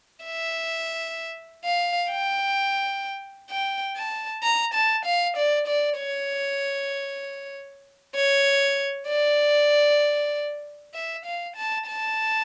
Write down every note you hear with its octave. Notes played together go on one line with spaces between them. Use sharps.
E5
F5
G5
G5
A5
A#5
A5
F5
D5
D5
C#5
C#5
D5
E5
F5
A5
A5